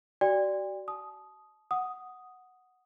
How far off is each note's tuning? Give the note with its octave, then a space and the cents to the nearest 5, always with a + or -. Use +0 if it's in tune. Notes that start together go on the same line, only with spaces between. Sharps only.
F#4 +40 D5 +0 G5 +40
A5 -35 D#6 +0
F#5 +0 D#6 +0